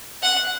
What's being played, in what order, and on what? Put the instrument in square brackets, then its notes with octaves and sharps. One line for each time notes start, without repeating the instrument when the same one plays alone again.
[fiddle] F#5